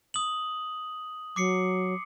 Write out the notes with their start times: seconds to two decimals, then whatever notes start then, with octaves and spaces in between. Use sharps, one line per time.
0.14 D#6 F#7
1.36 F#3 D6 C7 C#7